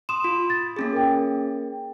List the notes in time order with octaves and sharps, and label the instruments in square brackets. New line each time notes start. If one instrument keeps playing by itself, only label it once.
[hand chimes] C6 D#6 [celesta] E7
[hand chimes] F4
[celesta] A6
[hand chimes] A#3 C#4 G#4
[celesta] A#4 G5